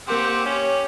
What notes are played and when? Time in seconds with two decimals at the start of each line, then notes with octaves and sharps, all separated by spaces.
0.08 A#3 C4 G4 A#4 F#5 C6
0.46 C#4 G4 C#5